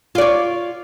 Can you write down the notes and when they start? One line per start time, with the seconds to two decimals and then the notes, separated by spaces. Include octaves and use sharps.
0.15 F4
0.18 D5
0.21 C#5